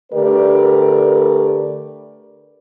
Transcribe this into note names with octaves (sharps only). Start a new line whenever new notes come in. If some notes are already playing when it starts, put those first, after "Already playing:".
D3 A3 G4 A#4 B4 D5